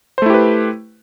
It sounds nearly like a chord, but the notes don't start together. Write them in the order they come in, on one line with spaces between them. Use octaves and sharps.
C5 A3 E4 G4 B4